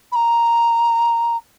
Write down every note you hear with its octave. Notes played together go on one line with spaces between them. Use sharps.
B5
A#5